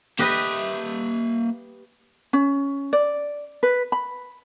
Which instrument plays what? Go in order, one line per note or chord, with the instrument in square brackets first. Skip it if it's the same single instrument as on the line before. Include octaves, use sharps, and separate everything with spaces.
[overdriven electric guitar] A#3 E5 [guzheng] G4 B4 D#5
[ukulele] C#4
D5
B4
B5